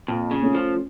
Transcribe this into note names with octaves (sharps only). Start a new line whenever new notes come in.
F2 A#2
C#3
A3 C#4 F4
F3